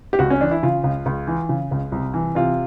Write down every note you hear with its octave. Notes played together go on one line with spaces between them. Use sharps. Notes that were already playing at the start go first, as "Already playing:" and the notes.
G4
C#2 F#4
C#4
E3 D4
E4
C#3 F4
C#2
C#2
E3
C#3
C#2
C2
E3
C3 F4